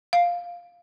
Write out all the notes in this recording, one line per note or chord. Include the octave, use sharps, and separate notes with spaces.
F5